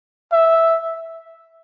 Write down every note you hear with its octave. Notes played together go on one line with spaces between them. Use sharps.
E5